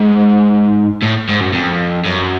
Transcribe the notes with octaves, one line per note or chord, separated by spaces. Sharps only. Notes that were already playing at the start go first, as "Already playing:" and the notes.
Already playing: G#2
A2
G#2
F#2
F2
F#2